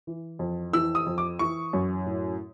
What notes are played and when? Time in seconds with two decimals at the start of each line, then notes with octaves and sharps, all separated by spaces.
0.07 E3
0.39 F2
0.73 E3 E6
0.95 D#6
1.06 F2
1.18 D6
1.39 E3 C#6
1.73 F#2
2.06 A2